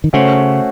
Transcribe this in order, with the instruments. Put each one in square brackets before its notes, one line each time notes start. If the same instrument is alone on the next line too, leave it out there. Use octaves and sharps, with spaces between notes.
[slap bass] D#3
[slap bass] C#3 [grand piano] A3 C#4 F#4 C5